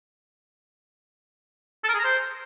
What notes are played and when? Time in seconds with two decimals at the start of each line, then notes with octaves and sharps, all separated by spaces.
1.84 A4
1.89 A#4
1.94 G#4
1.99 A#5
2.04 C5